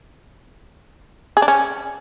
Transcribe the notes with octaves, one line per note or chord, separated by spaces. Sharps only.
G#4
D4
C#4